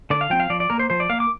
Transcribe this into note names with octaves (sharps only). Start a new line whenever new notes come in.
D3 D5
F5
F3 C4 G5
F5
F3 D5
D5
A#3 A#4
C5
F3 C5
D5
A#3 F5
D6